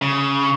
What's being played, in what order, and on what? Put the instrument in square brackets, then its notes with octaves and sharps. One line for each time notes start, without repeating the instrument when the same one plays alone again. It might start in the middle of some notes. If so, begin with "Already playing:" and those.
[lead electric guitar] C#3